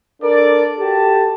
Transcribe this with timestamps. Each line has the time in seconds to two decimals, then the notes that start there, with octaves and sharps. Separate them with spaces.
0.21 D4 A4 A#4 D5
0.79 F#4 G4 A4 A5